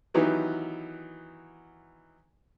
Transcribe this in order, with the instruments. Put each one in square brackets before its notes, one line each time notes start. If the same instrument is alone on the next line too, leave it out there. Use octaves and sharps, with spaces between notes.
[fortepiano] D#3 E3 F#3 B3 D#4 G4